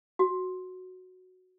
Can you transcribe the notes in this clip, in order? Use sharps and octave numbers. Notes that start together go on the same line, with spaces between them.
F#4